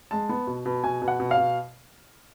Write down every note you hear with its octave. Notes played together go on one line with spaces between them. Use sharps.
G#3 A5
B3
B2
B2
B2 G#5
B2
F#5
B2
F5
B2